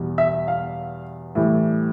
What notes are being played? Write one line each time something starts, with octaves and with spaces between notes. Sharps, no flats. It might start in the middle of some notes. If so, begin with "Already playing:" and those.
Already playing: E2 B2 G3
E5
F5
A2 E3 G3